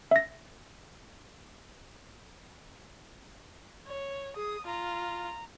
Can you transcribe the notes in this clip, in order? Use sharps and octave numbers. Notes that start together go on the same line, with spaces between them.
E5 A#6
C#5
G#4 D#6
F4 A#5